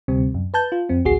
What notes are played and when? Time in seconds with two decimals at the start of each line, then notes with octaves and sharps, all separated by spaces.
0.08 D2 C3 G3 C4
0.34 F#2
0.54 B4 A5 G6
0.72 F4
0.89 F2 C4
1.05 A1 D2 F#4 G#4 C7